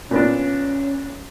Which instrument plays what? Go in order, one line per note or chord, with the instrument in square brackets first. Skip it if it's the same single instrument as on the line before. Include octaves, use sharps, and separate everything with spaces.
[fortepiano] A#2 B3 D4 [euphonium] C#4